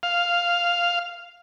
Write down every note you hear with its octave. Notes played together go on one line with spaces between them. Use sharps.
F5